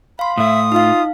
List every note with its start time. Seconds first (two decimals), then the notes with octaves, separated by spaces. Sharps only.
0.19 F5 B5 C6
0.37 A2 A3 E5 D#6
0.72 D#4 F4 F5